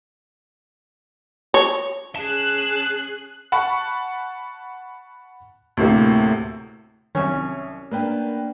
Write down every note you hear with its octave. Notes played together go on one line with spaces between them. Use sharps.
C#5
C#4 G#4 A5 F#6
F#5 A5 B5 C#6
D2 A2 C3 A#3
C2 D#3 F#3 C#4 C#5
A#3 B3 D4 A#4 B4 G5